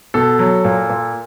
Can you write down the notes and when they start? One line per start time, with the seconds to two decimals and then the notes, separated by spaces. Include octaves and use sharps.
0.14 B2 A4
0.39 F#3
0.65 A#2
0.90 A#2